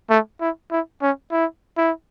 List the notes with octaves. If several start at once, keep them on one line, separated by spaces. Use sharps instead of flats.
A3
E4
E4
C#4
E4
E4